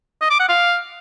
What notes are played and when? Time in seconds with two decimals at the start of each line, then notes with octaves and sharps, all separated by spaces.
0.21 D#5
0.30 D6
0.39 F#5
0.49 F5